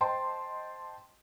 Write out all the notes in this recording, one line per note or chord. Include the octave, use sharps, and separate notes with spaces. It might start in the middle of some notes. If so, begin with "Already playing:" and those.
C5 D#5 G5 A5 C6